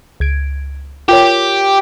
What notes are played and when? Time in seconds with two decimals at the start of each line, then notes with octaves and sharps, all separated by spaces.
0.20 C#2 G#6 D7
1.09 F4 G4 A#4 C#5